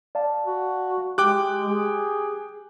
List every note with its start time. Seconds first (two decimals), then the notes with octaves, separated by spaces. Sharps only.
0.15 D5 F5 A5
0.45 F#4
1.18 G#3 G4 G5 D6 F#6
1.69 G#4